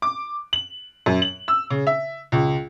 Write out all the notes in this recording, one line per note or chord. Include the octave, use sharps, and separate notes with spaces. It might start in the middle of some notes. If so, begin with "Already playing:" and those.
D6
F#7
F#2
F#7
E6
C#3
E5
C#2